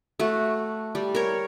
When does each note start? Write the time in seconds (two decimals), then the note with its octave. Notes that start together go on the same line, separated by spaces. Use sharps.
0.20 A3 F#4
0.95 G3
1.15 A#4 C#5